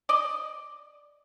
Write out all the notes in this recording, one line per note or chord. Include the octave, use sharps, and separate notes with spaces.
D5 D#5